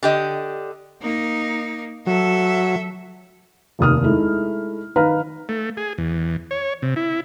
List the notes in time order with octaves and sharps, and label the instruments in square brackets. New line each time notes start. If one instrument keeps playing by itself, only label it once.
[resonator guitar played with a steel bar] D3 G4 D#5
[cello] A#3 D#4
[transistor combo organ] F#3 [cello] A4 E5
[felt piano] F1 D#2 D#6 F6
G#3 A3 D#4 E4
D#3 B4 F5 A#5 F6
[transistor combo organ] A3
G#4
E2
C#5
C3
E4